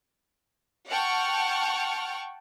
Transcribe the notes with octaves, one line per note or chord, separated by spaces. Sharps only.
F#5 G5 A5 C#6 F6